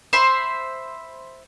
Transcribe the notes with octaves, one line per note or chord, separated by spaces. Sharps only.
C5 E5 B5